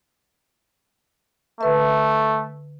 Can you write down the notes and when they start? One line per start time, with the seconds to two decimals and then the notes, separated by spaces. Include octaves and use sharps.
1.61 D3 A3 B4 E5